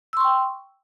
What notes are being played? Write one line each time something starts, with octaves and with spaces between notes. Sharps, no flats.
G5 C6 C#6 E6